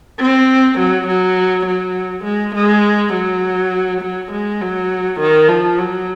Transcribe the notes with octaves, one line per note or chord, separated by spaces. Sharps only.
C4
F#3
F#3
F#3
G#3
G#3
F#3
F#3
G#3
F#3
D#3
F3
F#3